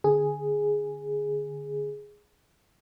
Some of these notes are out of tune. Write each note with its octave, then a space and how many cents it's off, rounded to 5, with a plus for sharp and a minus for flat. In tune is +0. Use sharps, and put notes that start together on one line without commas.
D3 +0 G#4 +0